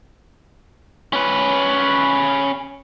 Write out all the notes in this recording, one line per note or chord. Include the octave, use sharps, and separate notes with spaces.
C#4 B4